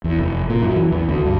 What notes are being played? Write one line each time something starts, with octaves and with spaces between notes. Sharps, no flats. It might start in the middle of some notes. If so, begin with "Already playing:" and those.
E2
F1
A#2
F#2
E3
E2
D2
G2